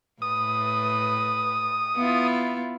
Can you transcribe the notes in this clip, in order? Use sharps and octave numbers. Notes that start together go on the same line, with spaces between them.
A2 B4 D#6
B3 E4 F4